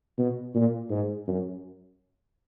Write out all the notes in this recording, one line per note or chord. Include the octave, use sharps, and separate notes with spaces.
B2
A#2
G#2
F#2